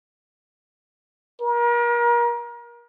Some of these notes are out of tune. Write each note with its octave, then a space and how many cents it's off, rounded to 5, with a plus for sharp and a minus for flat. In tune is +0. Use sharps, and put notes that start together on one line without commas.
A#4 +35